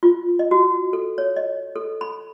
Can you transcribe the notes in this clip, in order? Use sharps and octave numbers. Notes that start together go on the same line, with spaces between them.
F4
D#5
F#4
A4
C#5
D#5
A4
B5